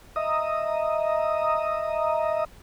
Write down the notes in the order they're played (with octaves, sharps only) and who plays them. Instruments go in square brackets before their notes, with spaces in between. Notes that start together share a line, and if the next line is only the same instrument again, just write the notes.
[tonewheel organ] D#5 E5 A#5 D#6